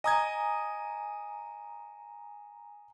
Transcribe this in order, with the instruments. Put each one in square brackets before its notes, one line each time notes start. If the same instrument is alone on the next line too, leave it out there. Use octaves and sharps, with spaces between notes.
[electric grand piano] D#5 D#6 G#6 [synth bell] G#5 A#5